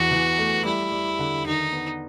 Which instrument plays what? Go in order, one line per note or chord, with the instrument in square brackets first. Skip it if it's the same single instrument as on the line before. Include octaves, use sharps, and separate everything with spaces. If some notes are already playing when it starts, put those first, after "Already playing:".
Already playing: [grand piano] E2 E3 [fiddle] F#4
[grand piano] E3
A3
[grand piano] G3 [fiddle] E4
[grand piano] G3
D3
[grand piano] D#3 [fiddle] D#4
[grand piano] B3